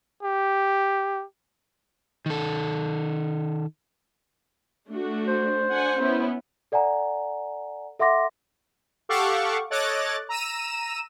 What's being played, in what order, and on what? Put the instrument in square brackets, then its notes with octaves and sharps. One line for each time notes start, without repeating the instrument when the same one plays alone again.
[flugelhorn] G4
[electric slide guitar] D#3 A4
[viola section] A3 D4 F#4
[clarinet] C5
[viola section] D4 F#5 G#5
B3 C#4 E4
[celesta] A4 D5 F#5 G#5 A#5
A4 E5 F#5 C6 D6 A#6
[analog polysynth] G4 A4 F5 F#5 C#6 D6
A4 C#5 D#5 D6 F#6 A6
A#5 E6 D#7 E7